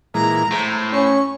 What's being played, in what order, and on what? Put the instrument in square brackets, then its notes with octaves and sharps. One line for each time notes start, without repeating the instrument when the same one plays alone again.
[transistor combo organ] A#2 E3 G#3 [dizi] A#5
[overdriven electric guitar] A2 [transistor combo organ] C5
[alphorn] C#4 [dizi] C#6